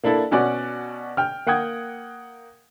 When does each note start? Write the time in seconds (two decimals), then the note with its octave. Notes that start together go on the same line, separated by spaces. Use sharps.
0.04 A#3 D4 E4 A4
0.31 B2 C#4 F#4 D5 D6
1.17 G5 F6
1.46 A#3 F#5 G5 D#6 G#6